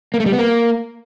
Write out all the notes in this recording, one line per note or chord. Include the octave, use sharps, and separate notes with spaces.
A#3
A3
G3
B3
A#3